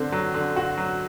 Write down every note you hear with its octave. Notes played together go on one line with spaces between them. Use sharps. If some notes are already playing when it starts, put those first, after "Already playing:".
Already playing: D3 C4
F#3
D3
F#4
F#3